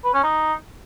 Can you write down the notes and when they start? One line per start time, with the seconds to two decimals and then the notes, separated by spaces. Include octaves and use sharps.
0.04 B4
0.14 C#4
0.23 D#4